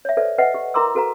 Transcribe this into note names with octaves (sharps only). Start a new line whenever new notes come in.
C#5 E5
A4 B4 C5 D5 E5
B4 D#5 E5 F#5
G4
E4 A#4 A#5 C6 D6 E6
F#4 A4 B4 F5 A#5